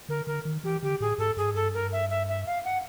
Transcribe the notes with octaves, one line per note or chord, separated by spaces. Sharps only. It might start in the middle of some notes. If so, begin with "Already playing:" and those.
D3 A#4
D3 A#4
D#3
E3 G4
D3 G4
A2 G#4
G#2 A4
G2 G#4
G#2
G2 A4
A#4
E5
E5
E5
F5
F#5